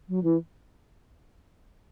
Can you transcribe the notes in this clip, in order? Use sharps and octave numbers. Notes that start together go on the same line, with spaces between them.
F#3
E3